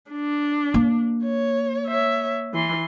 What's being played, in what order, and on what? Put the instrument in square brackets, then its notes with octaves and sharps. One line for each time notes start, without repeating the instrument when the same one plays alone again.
[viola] D4
[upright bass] A#3
[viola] C#5
C#5 E5
E3 C6